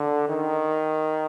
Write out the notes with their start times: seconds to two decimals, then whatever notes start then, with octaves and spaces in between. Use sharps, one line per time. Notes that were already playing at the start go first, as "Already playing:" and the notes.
Already playing: D3
0.29 D#3